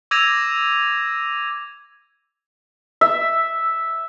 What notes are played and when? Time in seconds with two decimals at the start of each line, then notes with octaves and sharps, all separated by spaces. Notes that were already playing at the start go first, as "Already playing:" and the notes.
0.11 D6 E6 G#6 A#6 D#7 F7
3.01 E5